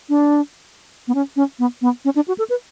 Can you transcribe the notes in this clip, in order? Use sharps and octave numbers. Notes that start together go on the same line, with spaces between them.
D4
B3
C#4
C#4
B3
B3
C#4
D4
F#4
A4
B4